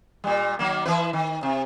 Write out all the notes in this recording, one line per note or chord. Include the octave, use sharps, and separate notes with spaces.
A#2 G3
D#3 F#3 A#3
E3 E4 B4
D#3
C3